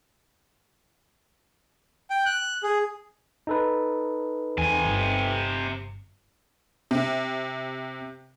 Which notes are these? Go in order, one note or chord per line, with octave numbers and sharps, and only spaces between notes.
G5
F#6
G#4
D#4 A4 B4
E2 C3 G#5
G1
C3